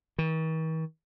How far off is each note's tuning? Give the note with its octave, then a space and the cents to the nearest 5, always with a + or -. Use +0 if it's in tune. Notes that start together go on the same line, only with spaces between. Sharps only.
D#3 +45